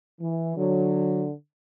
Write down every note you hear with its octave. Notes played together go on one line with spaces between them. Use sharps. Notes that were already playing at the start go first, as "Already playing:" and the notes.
E3
D3 F#3